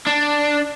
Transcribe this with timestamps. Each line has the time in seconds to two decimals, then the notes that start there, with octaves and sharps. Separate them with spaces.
0.07 D4